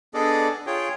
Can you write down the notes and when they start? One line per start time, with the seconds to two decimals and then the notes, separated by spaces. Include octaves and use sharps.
0.14 B3 D4 G#4 A4 D5 D#5
0.67 F4 G#4 C#5 G5